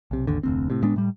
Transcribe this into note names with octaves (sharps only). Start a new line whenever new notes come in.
B1 C3
G#1 D#2 D3
F1 D2 C4
A2 C3
A2 G#3 B3 D4
A2 G3